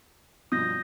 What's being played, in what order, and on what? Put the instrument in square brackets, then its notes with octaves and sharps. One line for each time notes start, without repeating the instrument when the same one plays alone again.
[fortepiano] G2 B2 F3 [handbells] D#6 G6 A#6